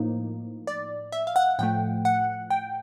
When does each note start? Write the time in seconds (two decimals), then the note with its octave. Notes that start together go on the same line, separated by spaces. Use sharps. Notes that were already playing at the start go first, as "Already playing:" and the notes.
Already playing: A2 F3 A#3 D#4
0.67 D5
1.12 E5
1.27 F5
1.36 F#5
1.59 A2 F3 A3 G5
2.05 F#5
2.50 G5